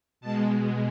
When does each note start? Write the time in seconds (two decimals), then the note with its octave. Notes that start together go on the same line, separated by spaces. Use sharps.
0.21 B2 G#3 A5